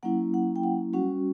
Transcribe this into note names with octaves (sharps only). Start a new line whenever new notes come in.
F#3 A#3 C#4 E4 F#5
F#5
G5
F#5
G3 C#4 F#4 F#5